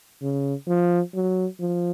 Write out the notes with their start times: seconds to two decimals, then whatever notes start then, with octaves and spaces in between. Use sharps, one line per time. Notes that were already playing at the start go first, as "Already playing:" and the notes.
0.22 C#3
0.68 F3
1.14 F#3
1.60 F3